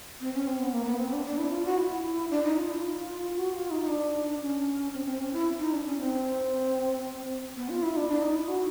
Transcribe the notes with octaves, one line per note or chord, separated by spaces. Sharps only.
C4
C#4
C4
B3
A#3
B3
C4
D4
D4
E4
F4
F#4
E4
D4
D#4
F4
E4
F4
F#4
F4
D#4
D#4
D4
C#4
C4
C4
C#4
E4
D#4
D4
C#4
C4
B3
F4
E4
D4
D4
D#4
E4
F#4